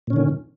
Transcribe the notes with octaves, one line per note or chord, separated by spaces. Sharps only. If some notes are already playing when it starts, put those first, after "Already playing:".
A#2 D3 D#3 C#4